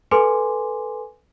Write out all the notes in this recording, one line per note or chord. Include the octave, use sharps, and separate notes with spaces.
A4 B4 G#5 C6 D6